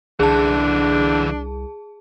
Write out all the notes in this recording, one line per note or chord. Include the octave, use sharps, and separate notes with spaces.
C2 D3 E3 D4 G#4 A5